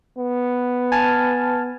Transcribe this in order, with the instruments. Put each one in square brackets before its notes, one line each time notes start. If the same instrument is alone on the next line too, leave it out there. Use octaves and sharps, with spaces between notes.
[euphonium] B3
[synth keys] G#5 A5 F6